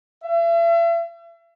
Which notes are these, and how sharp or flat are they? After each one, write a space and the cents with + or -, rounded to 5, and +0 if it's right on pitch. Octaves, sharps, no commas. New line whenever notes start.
E5 +40